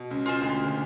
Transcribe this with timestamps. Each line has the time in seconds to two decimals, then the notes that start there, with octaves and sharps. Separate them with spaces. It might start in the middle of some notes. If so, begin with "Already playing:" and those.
Already playing: B2
0.11 C#2 C#3
0.26 F4 G#4 C5
0.41 D2 D3